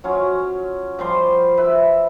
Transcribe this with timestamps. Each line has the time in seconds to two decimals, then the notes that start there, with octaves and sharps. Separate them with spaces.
0.04 F#3 C#4 F4
0.99 F3 G3 C6
1.57 B4 E5